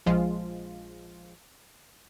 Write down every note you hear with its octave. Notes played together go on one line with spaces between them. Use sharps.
A#1 F3 G#3 F4